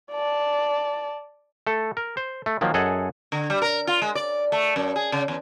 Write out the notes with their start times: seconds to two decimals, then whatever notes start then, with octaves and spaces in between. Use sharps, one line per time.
0.11 D5 A5
1.67 A3 A4
1.97 A#4
2.17 C5
2.46 A3
2.61 D#3 F3 F#3 A#3
2.74 F#2 G#4 A4 D#5 F#5 G#5
3.32 D3
3.50 G3
3.62 A#4
3.87 F4
4.02 G#3
4.15 D5
4.52 A3
4.76 F#2
4.96 G#4
5.12 C#3
5.28 E2